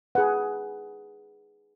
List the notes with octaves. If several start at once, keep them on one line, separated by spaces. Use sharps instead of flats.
D#4 G#4 B4 F#5